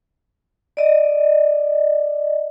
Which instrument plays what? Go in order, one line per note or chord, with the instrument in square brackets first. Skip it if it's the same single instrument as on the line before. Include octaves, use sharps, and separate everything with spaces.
[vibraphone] D5 D#5